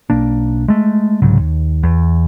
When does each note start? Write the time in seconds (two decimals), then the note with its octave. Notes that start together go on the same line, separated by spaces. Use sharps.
0.10 B1 A#3 D4
0.68 G#3 A3
1.22 C2 G#2 C#3 F#3
1.39 D#2
1.83 E2